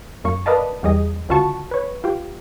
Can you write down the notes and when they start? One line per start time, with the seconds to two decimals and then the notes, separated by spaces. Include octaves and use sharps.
0.24 F#2 A#3 C#6
0.46 A#4 B4 D5 D#5 F5 A5
0.83 E2 G3 G#4 D#5
1.29 C#2 D3 F4 F#4 A5 C#6
1.71 B4 C#5
2.04 F4 G4